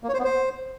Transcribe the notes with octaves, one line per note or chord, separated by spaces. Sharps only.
A#3
C#5
C5
B3
C5